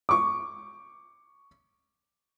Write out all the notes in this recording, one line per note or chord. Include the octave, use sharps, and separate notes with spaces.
C#6 D6